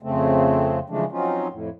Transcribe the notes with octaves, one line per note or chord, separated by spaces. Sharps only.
F2 C#3 A3 C4
C#3 E3 F3 G#3 A3 D4
F3 F#3 C4 C#4 D#4 F4
F2 A2